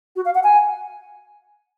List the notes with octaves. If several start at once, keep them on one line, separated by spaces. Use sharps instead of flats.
F#4
F5
F#5
G#5